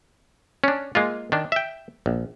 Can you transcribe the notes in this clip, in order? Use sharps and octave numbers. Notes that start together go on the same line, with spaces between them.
C#4 D4
G#3 A#3 F4
D#3 D4
E5 G5
A#1